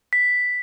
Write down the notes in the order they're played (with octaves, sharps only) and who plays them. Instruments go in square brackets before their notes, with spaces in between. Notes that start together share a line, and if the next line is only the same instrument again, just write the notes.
[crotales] B6